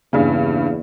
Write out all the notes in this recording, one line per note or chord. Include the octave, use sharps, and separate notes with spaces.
E2 G2 C#3 A#3 G#4 D5